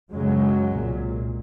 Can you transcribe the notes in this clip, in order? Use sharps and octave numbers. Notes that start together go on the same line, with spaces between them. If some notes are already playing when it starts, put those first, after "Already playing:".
F#2 C#3 F#3 G#3
C2 A#2